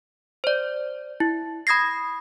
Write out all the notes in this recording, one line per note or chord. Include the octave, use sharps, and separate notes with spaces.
C5 D5
E4
B5 D#6 G#6 A#6 C7